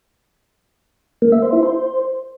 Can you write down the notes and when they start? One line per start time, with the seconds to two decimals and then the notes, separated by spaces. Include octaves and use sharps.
1.22 A#3
1.32 E5
1.42 C5
1.53 E4
1.63 C5